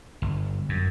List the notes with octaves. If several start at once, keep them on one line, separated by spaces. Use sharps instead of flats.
G1
F#2